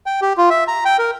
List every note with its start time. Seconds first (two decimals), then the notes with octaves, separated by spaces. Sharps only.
0.06 G5
0.22 G4
0.37 F4
0.50 E5
0.68 A#5
0.85 G5
0.99 A#4